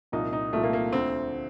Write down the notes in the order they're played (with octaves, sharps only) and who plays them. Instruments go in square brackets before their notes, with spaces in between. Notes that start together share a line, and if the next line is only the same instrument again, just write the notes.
[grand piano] C2 A#2 F3 D#4
D#4
C2 A#2 F3 A3
A#3
A#3
D2 D3 F3 C4